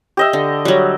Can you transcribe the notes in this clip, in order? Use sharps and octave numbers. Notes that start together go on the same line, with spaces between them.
G4 D#5 E5
D3
F#3 G3